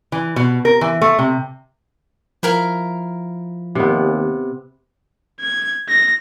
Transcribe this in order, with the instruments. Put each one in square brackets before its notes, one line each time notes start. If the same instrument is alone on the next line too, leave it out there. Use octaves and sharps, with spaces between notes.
[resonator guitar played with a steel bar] E3
B2
A#4
E3
A3
C3
[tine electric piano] F3 [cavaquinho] E4 A#4 F5
[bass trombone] D#2 [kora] C3 B3
[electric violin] G#6
A#6